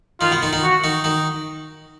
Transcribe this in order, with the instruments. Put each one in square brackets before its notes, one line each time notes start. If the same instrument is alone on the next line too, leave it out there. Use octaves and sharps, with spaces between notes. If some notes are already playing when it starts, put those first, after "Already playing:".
[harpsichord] D#3 D#4 [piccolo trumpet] F4
[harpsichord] B2 B3
D#3 D#4
D#3 D#4
[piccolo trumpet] F#4
[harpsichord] D#3 D#4
D#3 D#4